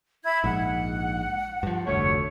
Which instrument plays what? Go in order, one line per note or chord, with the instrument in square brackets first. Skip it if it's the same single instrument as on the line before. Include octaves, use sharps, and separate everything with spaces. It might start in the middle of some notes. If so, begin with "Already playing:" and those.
[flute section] E4 G#6
[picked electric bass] A#1 G#2 [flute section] F#5
[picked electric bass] G2 F3
[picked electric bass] F1 D2 A3 [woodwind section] C#5